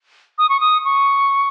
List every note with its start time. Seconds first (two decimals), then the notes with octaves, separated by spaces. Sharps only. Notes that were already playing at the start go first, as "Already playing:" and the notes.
0.38 D#6
0.49 C#6
0.60 D#6
0.85 C#6